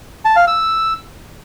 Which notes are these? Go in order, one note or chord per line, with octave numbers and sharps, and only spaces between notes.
A5
F5
E6